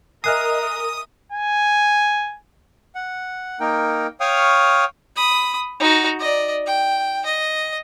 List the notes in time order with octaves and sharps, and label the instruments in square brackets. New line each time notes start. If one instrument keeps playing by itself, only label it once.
[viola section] A#4 [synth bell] D#5 E5 G#5 [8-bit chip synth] D#6 [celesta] F6 F#6 C7
[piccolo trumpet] G#5
[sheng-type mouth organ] F#5
A#3 D#4 A#4 G5
C#5 F5 G5 C#6 D#6 F6
[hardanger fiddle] B5 D#6
D#4 F#4
D5 D#5
G5
D#5